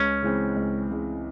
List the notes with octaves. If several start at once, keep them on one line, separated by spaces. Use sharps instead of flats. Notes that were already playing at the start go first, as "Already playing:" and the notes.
Already playing: C#2 C#4
C#3 E3 G#3 C4
C#2
C#3 E3 G#3 C4